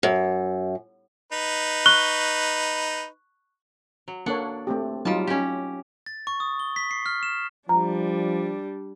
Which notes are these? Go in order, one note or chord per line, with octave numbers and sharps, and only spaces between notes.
F#2
D#4 B4
C#6 F#6 G7
F#3
A#3 D4 A4 C#5 F#5
A3 C4 G4
F#3 G3 D#4 F4 A5
C#4 G4
A6
C#6
D#6
G7
B6
C7
F6
E7
F3 G3 D4 A#5